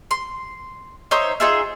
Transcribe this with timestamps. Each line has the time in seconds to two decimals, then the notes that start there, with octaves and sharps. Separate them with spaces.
0.11 C6
1.11 D#4 C5 C#5 E5
1.40 D#4 F4 G#4 E5